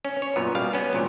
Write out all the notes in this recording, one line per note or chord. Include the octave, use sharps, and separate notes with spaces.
C#4
C#5
F#2 A#2 B3
B2 G3 F5
B3 C#4
G#1 A#2 F#3